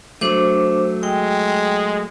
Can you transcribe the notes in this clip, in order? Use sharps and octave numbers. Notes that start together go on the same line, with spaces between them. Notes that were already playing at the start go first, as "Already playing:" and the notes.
F#3 A3 D4 C5 D6
G#3 G5